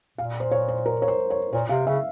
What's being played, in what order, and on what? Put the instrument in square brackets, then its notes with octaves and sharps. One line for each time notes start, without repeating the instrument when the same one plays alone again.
[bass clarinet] A#2 [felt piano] F5
[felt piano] C5
C#5
C5
A#4
C#5
C5
C#5
[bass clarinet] A#2 [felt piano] C#5
[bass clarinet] C3 [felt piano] F5
[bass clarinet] C#3 [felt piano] E5